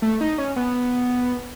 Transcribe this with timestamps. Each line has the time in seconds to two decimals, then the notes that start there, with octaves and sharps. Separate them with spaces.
0.02 A3
0.21 D#4
0.38 C#4
0.56 B3